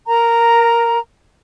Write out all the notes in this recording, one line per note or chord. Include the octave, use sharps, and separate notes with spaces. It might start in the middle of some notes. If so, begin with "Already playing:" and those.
A#4 A#5